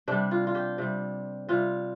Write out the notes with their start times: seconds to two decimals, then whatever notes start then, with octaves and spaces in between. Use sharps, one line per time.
0.08 C3 G3 D4
0.31 F4
0.47 F4
0.55 G4
0.78 C3 G3
1.49 C3 G3 F4